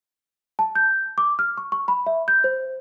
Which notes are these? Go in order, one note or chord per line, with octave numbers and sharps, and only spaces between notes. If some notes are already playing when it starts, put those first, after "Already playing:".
A5
G6
D6
F6
C#6
C#6
B5
E5
G6
C5